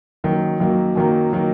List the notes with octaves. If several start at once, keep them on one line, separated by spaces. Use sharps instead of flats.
F#2 D#3 F#3 A#3
F#2 D#3 F#3 A#3
F#2 D#3 F#3 A#3
D#3 F#3 A#3